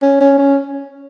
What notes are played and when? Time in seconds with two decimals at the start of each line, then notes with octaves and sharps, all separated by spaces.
0.02 C#4
0.21 C#4
0.38 C#4